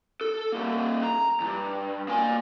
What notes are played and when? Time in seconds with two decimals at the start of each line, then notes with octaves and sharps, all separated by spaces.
0.21 A4
0.52 G3 A#3
1.03 A#5
1.40 E2 G2
2.08 A#3 G#5